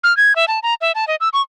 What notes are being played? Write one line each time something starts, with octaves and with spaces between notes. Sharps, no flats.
F6
G#6
E5
A5
A#5
E5
A5
D#5
E6
C#6